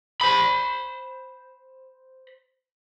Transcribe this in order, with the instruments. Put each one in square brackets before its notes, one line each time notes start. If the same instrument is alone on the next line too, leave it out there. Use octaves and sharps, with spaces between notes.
[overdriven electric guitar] C5 B5